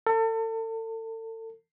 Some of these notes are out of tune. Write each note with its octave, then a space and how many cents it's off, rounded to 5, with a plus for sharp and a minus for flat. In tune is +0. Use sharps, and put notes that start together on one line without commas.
A4 +35